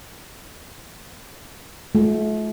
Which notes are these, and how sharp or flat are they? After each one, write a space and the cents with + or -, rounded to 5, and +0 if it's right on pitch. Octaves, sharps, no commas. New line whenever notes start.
A3 -40 F4 +25